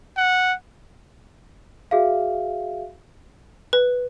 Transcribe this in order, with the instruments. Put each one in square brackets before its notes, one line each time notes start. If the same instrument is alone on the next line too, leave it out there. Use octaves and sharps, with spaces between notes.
[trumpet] F#5
[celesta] F#4 G#4 E5 F5
[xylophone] B4